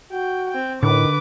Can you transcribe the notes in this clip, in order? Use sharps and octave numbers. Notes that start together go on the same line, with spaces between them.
F#4 G5
C4 G5
A2 D3 D#3 B4 D6